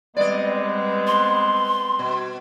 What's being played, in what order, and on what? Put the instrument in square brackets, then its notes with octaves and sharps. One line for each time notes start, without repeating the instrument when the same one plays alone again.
[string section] G3 B3 C4 [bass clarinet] G#3 [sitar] D5 D#5
[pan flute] C6
[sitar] B2